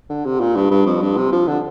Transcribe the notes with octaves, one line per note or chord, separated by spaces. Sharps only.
D3
C3
A#2
G2
G2
F2
G2
C3
F3
D3